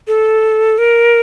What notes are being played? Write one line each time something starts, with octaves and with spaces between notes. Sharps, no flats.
A4
A#4